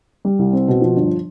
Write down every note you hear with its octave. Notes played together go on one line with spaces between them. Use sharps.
G3
C2
C4
B2
F3
G1